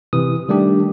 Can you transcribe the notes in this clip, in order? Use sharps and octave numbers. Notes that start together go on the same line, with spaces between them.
C3 E3 D#6
D#3 G3 A3 D4 G4